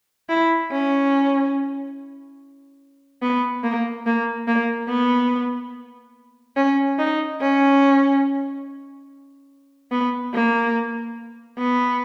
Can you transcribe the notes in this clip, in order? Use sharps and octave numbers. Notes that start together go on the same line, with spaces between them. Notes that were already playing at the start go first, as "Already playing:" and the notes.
E4
C#4
B3
A#3
A#3
A#3
B3
C#4
D#4
C#4
B3
A#3
B3